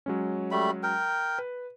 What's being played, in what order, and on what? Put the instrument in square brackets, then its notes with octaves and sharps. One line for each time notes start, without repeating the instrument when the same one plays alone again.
[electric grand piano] F#3 G#3 C#4
[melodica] G3 A3 B5
A#4 G5
[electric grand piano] B4